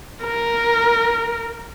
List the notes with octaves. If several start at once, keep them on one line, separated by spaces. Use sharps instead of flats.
A#4